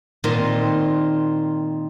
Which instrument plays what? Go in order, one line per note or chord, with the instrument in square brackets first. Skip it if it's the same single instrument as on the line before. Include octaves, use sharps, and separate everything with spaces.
[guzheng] A#2 D#3 C4 D#4